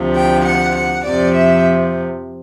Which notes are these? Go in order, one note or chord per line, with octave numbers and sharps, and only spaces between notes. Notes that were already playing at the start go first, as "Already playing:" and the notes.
Already playing: D2 C3 F3
G5
F#5
F#5
F2 C3 F3 D5
E5